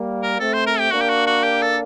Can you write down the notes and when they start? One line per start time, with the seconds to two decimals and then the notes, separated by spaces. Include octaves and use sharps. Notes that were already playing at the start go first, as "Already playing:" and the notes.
Already playing: G3 A#3
0.23 A#4
0.40 A3 C4 A4
0.54 C5
0.67 A#4
0.79 G4
0.92 A#3 D4 F#4
1.02 G4
1.10 F#4
1.27 F#4
1.44 G4
1.62 A4